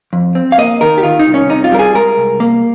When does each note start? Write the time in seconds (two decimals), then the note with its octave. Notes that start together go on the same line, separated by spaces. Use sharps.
0.13 F2
0.35 C4
0.52 F5
0.58 A#3 D#5
0.81 D#3 A#4
0.98 G4
1.03 D#3 F4
1.19 D#4
1.27 C2
1.34 C#4
1.50 C3 D#4
1.64 F4
1.72 G3 A#4
1.79 G#4
1.94 G#3 A#4
2.17 C2
2.40 A#3